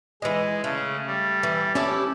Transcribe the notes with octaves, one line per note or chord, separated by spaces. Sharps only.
E3 G#3 D#5
C#3 A3
G3
E3
C#4 E4 G4 A4 C#5 D6